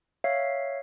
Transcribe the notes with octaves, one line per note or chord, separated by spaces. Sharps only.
C#5 E5 F5 C7